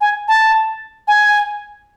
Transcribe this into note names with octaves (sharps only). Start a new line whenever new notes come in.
G#5
A5
G#5